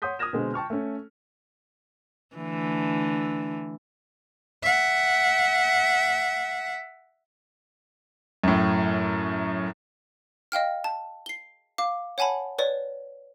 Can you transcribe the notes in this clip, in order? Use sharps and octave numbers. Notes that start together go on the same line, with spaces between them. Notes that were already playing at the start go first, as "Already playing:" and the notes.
C#5 F#5 C6 D#6 G6 B6
D#6 F6 G#6 A#6 E7
B2 D3 G#3 C4
G5 A5 C#6 F6
A3 C#4
D3 E3 A3
E5 F#5
F#2 A2
D#5 F5 G5 F6
A5
C7 G7
F5 D6
C#5 F#5 G#5 A5 B5
B4 C#5 D5